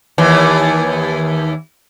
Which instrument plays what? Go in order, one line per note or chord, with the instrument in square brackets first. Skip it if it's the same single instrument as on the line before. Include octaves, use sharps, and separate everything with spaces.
[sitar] D#2 E3